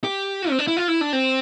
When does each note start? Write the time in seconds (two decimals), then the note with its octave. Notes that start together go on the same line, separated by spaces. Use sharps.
0.04 G4
0.50 C4
0.59 D4
0.67 E4
0.77 F4
0.88 E4
1.01 D4
1.13 C4